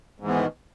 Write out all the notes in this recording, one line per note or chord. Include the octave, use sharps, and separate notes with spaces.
G#2 B2 D#3 E3 B3